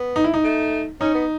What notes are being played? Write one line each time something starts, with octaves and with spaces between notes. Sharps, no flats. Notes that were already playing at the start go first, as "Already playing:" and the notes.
Already playing: B3
D#4
E4
D#4
A3
C#4 D#4
B3